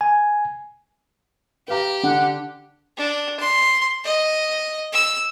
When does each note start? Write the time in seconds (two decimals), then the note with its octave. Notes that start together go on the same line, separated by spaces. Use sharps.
0.01 G#5
1.68 G4 B4 F5 A#5
2.03 D3 D4 F#5
2.97 D4
3.39 C6
4.05 D#5
4.93 E6